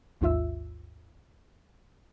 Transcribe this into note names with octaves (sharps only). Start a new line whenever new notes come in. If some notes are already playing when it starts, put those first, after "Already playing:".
A1 D#2 G#2 F4 E5 E6